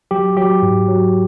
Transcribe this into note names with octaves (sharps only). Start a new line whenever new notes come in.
F#3 G4
F#3 G4
G#2
F#3